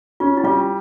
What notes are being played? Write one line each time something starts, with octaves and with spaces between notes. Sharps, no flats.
C#4 F4
E4
G3 F4